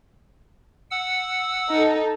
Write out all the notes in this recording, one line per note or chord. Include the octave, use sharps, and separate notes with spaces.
F#5 E6
D#4 A4